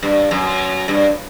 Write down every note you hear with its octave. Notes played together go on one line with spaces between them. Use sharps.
G2
F#2
G2